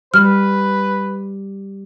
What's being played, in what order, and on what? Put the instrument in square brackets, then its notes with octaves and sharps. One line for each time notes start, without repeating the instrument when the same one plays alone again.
[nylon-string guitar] G3 [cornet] B4 [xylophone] F6